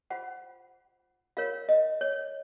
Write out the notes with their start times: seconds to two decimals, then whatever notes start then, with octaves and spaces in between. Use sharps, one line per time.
0.10 F4 C5 F#5
1.37 F4 A#4 C#5 F5
1.69 D#5
2.01 C#5